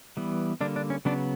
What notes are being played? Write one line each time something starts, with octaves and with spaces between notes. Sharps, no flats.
E3 G3 B3
D3 G3 A#3 D4
D4
C#4
C#3 F#3 B3 D4